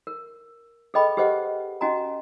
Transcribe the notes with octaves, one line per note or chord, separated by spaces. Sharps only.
A#4
G#4 A4 B4 D#5 G5 B5
G4 G#4 B4 C5 D#5 F#5
C#4 F#4 D#5 G#5 A#5